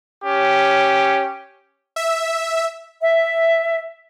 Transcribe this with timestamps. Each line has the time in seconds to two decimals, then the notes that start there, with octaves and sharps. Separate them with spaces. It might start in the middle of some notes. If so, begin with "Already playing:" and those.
0.25 C#4 G4
1.96 E5
3.01 E5